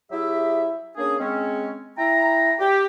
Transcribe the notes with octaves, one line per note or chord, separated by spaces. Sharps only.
F#3 E4 G4 G#4 E5
A#3 C#4 D4 G#4
G#3 C4 C#4
E4 G5 A#5
G4